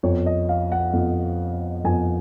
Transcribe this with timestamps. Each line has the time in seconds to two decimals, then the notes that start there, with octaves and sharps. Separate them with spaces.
0.03 F2 F3 B3 C#5
0.26 D#5
0.49 F5
0.72 F#5
0.93 F2 F3 B3
1.84 F2 F3 B3 G#5